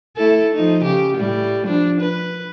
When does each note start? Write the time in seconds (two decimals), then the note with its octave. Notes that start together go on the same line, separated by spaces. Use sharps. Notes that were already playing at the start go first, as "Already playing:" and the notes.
0.17 A3 E4 A4
0.54 F3 D#4
0.84 C#3 G4
1.17 A2 G3
1.65 F3 D4
2.01 B4